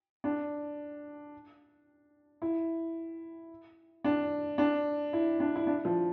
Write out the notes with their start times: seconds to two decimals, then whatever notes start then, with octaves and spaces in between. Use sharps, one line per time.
0.24 D4
2.42 E4
4.04 D4
4.58 D4
5.13 E4
5.40 D4
5.55 E4
5.67 D4
5.85 F3